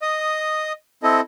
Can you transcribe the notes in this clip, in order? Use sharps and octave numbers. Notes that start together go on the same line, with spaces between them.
D#5 D#6
C4 E4 A4 D#5